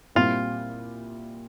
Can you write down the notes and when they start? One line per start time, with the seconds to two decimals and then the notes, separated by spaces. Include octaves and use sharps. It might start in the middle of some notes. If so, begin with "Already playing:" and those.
0.15 A#2 G3 C4 E4 F4